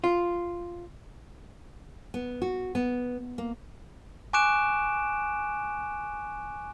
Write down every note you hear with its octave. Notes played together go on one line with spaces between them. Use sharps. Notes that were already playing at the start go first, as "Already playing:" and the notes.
F4
B3
F#4
B3
A#3
G#5 C#6 D6 F#6 D7 E7